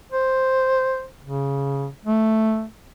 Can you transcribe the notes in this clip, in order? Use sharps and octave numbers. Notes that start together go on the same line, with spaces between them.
C5
C#3
A3